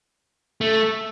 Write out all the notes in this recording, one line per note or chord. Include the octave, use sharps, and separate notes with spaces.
A3